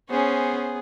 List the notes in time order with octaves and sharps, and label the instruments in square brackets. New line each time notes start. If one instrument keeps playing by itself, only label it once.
[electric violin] B3 G#4 [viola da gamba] C#4 [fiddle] C5